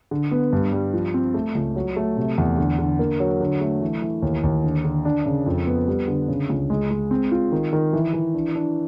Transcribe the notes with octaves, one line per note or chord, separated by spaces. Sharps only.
D3
B3
G2
G3
F3
C4
A3
C#2
F#3
A3
C3
E2
D3
D3
A#3
F#3
D3
A3
E3
E3
D#2
D#2
D3
D3
D4
C#3
F2
B3
G3
D3
C#3
C#2
G#3
G#3
C4
F4
D#3
D#3
E3
E3
D4
D4